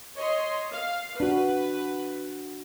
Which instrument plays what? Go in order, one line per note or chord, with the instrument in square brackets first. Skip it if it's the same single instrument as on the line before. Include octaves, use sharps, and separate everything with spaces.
[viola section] C#5 D#5 C6
F5
[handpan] D4 F#4 [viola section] B4